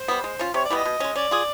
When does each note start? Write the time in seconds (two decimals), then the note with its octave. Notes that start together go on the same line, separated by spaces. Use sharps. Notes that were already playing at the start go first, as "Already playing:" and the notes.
Already playing: C5
0.08 G3 B3
0.24 G#3
0.39 C#4 F4
0.54 C3 C#5
0.65 D5
0.70 E3 G3 B3 D#5
0.85 B2
1.00 G#3 C#4
1.15 C#4 D5
1.31 F4 G#4